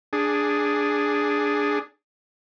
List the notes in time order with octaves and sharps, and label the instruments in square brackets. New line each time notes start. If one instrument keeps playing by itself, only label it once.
[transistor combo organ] D4 G#4